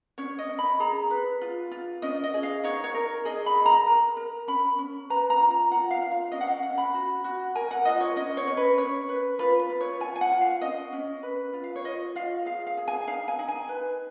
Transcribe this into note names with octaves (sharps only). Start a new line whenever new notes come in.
C#4 C#5
D#5
C#4
B5
G#4 A#5
B4
F4
F4
C#4 D#5
D#5
G#4
F5
D#4 C#5
C#5
A#4
G#4 D#5
B5
G#4
A#5
A#4
A#4
C#4 B5
C#4
B4 A#5
A#5
F4
A#5
F4 F#5
F5
F4
F5
C#4 D#5
F#5
F5
C#4 F#5
B5
F#4
F#4
A#4 G#5
F#5
F4 D#5
C#5
C#4 D#5
C#5
C#4
B4
C#4 C#5
B4
F4 B4
B4
F4
C#5
F4 G#5
G#5
F#5
F4
F5
C#4 D#5
C#4
B4
F4
F5
C#5
F4 D#5
F4 F5
G#4 F5
F5
G#4
G#5
D#4 F5
G#5
D#4
G#5
B4